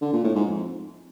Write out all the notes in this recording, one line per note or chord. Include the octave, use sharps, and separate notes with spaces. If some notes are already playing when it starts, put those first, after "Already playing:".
D3
A#2
A2
G#2
F2